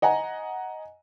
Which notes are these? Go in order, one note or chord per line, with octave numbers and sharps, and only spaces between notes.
D#5 F#5 G#5 A#5